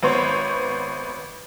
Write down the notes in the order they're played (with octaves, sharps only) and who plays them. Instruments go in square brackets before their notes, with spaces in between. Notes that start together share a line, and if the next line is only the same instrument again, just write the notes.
[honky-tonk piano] G#1 B3 C5 C#5